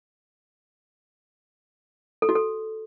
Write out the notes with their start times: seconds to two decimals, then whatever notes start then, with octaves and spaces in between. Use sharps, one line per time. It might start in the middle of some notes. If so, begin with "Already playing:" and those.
2.22 A4
2.29 F#4
2.35 A4